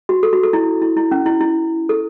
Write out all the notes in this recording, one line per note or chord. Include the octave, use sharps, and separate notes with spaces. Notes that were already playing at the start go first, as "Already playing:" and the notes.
F#4
A4
F#4
A4
E4
E4
E4
C#4
E4
E4
A4